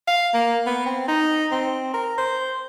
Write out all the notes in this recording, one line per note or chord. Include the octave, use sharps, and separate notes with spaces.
F5
A#3
B3
C4
D#4
C4
A#4
C5